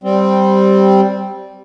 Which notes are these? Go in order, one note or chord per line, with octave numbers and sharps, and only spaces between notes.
G3 C4